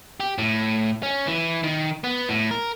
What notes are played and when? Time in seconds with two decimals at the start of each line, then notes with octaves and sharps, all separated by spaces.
0.20 G4
0.38 A2
1.03 C#4
1.27 E3
1.63 D#3
2.04 B3
2.29 A2
2.51 A#4